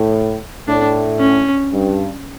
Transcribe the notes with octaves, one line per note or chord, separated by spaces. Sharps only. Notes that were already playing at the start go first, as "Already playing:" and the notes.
Already playing: A2
A2 D4
C#4
G2